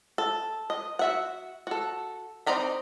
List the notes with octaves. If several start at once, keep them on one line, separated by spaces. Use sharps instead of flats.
A4
D#5
F#4 E5 F#5
F#4 A4
C4 D#4 D5 A#5 B5